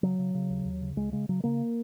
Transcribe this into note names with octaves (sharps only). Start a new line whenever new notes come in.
C#3 F#3
C#3
C#3
D#2
D#2
C#3
C#2 G#3
C#3 G#3
C#3 F#3
C#3 A#3